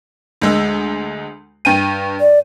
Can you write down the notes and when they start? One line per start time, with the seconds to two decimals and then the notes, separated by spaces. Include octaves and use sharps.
0.42 D2 G#3 E6
1.65 G2 G5 D#7
2.21 D5